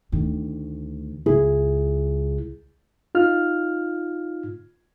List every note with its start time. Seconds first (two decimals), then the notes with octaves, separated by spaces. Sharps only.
0.12 D2 D#3
1.26 C#2 E4 G#4
3.15 D#4 F4 F6